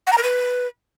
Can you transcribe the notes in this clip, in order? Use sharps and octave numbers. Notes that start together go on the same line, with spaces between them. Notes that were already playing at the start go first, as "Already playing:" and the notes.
F#5
A#5
A#4
B4